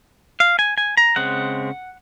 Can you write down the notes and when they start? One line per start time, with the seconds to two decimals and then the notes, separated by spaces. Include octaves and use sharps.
0.40 F5
0.59 G#5
0.78 G#5
0.97 A#5
1.16 C#3 G#3 C4 F#5